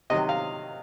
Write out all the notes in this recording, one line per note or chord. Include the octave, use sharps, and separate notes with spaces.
C3 D#3 F#3 D#5
F5